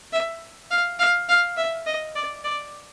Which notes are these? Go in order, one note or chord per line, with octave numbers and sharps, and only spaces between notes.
E5
F5
F5
F5
E5
D#5
D5
D5